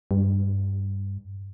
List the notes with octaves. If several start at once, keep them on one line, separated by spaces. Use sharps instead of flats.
G2